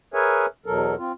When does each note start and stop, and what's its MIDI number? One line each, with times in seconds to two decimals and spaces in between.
0.14 0.46 68
0.14 0.46 70
0.14 0.46 71
0.14 0.46 73
0.14 0.46 76
0.14 0.46 80
0.66 0.95 40
0.66 0.95 47
0.66 0.95 54
0.66 0.95 69
0.66 0.95 70
0.98 1.12 60
0.98 1.12 65